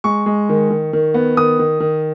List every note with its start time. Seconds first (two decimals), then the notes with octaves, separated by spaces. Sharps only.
0.04 G#3 C#6
0.26 G#3
0.49 D#3
0.70 D#3
0.93 D#3
1.14 B3
1.37 D#3 D#6
1.59 D#3
1.80 D#3